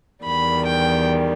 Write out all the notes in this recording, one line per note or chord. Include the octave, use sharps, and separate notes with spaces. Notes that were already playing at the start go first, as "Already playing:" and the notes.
E2 D#3 G3 B5
G5